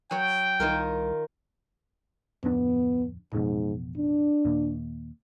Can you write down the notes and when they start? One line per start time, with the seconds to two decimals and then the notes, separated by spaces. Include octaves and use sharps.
0.11 F#3 C#5 G5
0.60 C2 D#3 F4 A#4
2.44 D1 F2 B3 D4
3.33 A1 F2 G#2 B2
3.97 D4
4.45 D#2 A#2